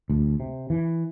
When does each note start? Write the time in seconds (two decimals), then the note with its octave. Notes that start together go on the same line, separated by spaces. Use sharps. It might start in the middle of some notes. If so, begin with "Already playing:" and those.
0.10 D2
0.40 C3
0.70 E3